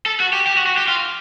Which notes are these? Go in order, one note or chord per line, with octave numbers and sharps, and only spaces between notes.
A4
F#4
G4
G4
F#4
F#4
G4
F4